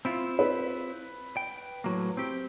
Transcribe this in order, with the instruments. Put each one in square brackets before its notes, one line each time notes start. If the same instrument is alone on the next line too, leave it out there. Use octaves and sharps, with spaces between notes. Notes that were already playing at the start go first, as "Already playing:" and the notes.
[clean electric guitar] C4 E4 F4
[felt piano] B4
[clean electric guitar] G5
A2 F#3 A#3
C4 G4